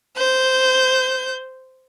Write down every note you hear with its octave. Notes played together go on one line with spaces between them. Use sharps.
C5 G6